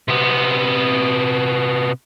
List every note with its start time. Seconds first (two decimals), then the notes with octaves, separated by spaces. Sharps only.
0.08 C3 B3